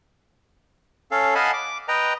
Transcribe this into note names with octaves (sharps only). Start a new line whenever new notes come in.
C#4 A4 F5
D#5 F5 F#5 G#5 A5 B5
D6
B4 D#5 G5 A#5